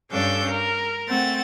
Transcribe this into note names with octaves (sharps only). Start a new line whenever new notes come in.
G2 C#4 D4 A4 F5 G6
A#4
A3 C4 F#5 A6